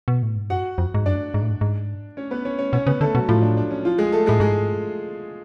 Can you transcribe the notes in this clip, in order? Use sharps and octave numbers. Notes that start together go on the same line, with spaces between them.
B2
A2
G#2
F#2 F#4 F#5
F2
G#2
F#2 D4 D5
G#2
A2
G#2
G#2
C#4 C#5
B3 B4
C#4 C#5
C#4 C#5
B2 C#4 C#5
C#3 B3 B4
D3 A3 A4
B2 F#3 F#4
A2 F3 F4
D4
D4
C#4
F3 F4
G#3 G#4
A3 A4
A2 G#3 G#4
G#2 G#3 G#4